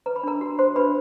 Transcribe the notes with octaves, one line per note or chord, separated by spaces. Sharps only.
B4 A#5
B5
D4 A#4 A#5
F#4
F#4 C5 C6
D4 B4 B5